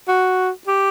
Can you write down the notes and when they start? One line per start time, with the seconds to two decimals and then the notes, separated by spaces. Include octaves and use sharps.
0.08 F#4
0.67 G4